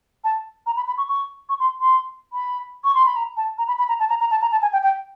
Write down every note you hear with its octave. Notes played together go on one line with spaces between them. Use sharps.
A5
A#5
B5
B5
C#6
C#6
C#6
C6
C6
B5
C#6
C6
B5
A#5
A5
A#5
B5
B5
A#5
A5
A#5
A#5
A5
A#5
A5
G#5
G5
G5